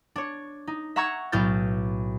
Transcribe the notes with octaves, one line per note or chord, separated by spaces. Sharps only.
D4 C#5
D#4
E5 F#5 A#5 C#6 E6 G#6
B1 A2 E4 F6 G6 A6